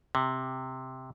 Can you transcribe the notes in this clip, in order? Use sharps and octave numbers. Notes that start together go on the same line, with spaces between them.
C3